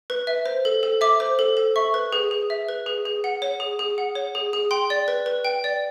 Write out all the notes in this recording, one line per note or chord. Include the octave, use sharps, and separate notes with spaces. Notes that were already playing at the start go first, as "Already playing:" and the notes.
B4
E5
C5
A4
A4
E5 D6
C5
A4
A4
E5 C#6
B4
G#4
G#4
E5
B4
G#4
G#4
F#5
C#5
G#4
G#4
F#5
C#5
G#4
G#4
G5 C6
D5
B4
B4
G5
D5